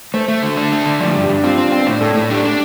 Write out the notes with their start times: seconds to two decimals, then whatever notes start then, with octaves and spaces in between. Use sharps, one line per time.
0.14 A3 C5
0.28 A3
0.43 D3
0.57 D4
0.72 A3
0.86 D3
1.00 F3 D5
1.11 G4
1.15 G2
1.22 G4
1.29 G2 D4
1.44 C4 F4
1.58 C4 D5
1.72 C4 G5
1.79 C5
1.87 A2 D5
2.01 A2 A4
2.15 A2 A4
2.30 D4 G4
2.44 D4